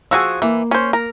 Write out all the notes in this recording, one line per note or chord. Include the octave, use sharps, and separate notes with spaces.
F3 F#4 G#4 E6
E3 A#3
C#4 C5
A#4